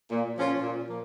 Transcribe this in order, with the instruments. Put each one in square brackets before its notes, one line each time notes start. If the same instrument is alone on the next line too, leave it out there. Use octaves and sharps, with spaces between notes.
[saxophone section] A#2
F3 A#3 C#4 F4
A#2
F3 A#3